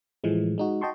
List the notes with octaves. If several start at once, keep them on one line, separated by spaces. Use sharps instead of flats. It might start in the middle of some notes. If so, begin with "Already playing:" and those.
A2 E3 F3 G#3 A3
G#3 D#4 F#4
F#4 D#5 G5 A5 C6 C#6